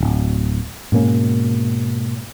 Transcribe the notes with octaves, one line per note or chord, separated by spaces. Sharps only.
D1
G#2 B2 A#3 C#4